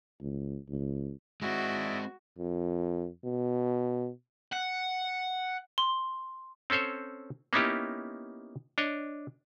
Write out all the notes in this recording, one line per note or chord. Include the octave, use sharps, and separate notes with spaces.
C#2
C#2
G#3 A#3 C4 E4 F#4 D5 D#5
F2
B2
F#5
C6
C4 C#4 A4 C5 C#5
A#3 B3 C#4 D#4 E4 G4
D4 C#5 D#5